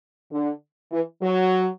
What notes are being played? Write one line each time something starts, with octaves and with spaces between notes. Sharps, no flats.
D3
E3
F#3